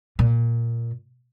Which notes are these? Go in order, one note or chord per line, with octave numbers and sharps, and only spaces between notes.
A#2